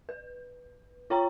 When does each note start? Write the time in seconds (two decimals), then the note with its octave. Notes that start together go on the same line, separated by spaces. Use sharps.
0.09 B4
1.10 F4 C#5 G5 A#5 C#6